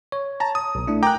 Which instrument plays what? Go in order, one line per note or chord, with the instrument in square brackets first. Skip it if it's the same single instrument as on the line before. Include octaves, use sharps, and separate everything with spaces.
[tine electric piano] C#5
[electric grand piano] A5 A#5
D#6
[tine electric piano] B1 B2
A3 D4 E4
[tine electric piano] A#4 G#5 F#6 [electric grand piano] G5 A#5 D6